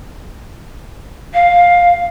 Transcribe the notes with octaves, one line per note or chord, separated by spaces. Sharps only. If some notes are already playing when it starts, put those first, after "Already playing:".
F5